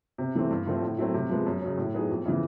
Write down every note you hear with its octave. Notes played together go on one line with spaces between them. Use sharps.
C3
E3 A3 C4
G2
D3 F3 A3 C4
A2
F#3 A3 C4 E4
C3
F3 G#3 B3
F#2
C#3 F#3
A2
F#3 B3 D#4 G#4
F2
C#3 E3